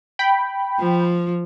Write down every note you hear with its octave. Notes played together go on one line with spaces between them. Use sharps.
G5 B5
F3